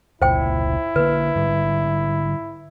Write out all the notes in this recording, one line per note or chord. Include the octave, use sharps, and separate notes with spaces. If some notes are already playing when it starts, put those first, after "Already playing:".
F1 C#2 A#2 E4 C5 G5
D3 A#3 B4
G#2 D3 G3